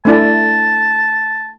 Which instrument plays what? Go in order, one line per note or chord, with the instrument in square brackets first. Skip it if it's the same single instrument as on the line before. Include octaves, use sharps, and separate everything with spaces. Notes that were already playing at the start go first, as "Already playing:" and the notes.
[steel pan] A3 D4 E4 [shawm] A5